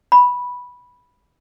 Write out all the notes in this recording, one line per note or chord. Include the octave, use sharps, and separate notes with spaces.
B5